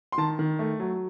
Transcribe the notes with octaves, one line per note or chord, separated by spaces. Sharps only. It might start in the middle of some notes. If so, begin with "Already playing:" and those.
C6
D#3 A5
D#3
A3
F#3